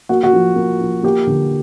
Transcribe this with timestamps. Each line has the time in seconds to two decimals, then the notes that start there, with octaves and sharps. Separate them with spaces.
0.09 A#3 F#4
0.23 F#4
0.33 F3
0.56 A#3
0.81 F3
1.03 A#3 G4
1.27 D3